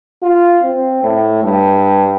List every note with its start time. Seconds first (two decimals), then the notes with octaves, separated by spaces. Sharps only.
0.23 F4
0.63 C4
1.04 A2
1.44 G2